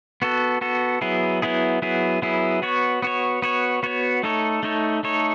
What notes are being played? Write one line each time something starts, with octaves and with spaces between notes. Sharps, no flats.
B3 F#4 A4
B3 F#4 A4
F#3 B3 E4 G#4
F#3 B3 E4 G#4
F#3 B3 E4 G#4
F#3 B3 E4 G#4
B3 F#4 C#5
B3 F#4 C#5
B3 F#4 C#5
B3 F#4 C#5
A3 D#4 A4 C#5
A3 D#4 A4 C#5
A3 D#4 A4 C#5